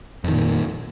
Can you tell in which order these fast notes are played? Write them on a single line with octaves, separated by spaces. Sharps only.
F2 D#3 A#2